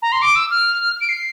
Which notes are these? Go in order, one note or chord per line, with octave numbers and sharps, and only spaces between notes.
A#5
C6
D6
E6
F6
D7
C7